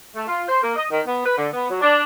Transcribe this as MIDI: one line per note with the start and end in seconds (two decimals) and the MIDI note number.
0.15 0.25 57
0.27 0.42 65
0.49 0.58 72
0.62 0.71 58
0.76 0.85 75
0.90 1.00 51
1.06 1.25 59
1.25 1.34 71
1.37 1.48 50
1.53 1.66 59
1.69 1.81 54
1.81 2.03 62